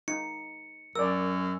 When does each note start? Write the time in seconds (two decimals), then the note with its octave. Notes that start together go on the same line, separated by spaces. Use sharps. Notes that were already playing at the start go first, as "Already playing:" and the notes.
0.08 D#4 C#7
0.95 F#2 A#4 D5 E6